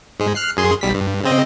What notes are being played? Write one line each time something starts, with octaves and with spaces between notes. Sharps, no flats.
G#2 G#3
F6 F#6 C7
F#2 G#4 C6
B1 G3 B6
G2
C#3 C4 D#5